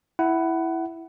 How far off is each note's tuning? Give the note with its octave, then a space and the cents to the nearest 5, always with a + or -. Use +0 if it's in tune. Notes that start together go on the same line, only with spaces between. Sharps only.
E4 +0 F#5 +15